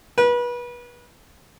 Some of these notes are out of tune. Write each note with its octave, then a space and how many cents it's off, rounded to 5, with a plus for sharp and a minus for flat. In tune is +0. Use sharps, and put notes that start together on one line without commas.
B4 -30